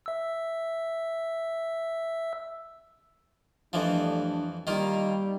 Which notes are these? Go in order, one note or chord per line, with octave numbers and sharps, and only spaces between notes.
E5 E6
F2 E3 F3 G3 A3 D4
D#3 G3 A#3 D#4 F4